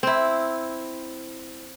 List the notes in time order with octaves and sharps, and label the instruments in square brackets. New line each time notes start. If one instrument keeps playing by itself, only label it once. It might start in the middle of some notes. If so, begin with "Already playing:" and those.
[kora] C4 E4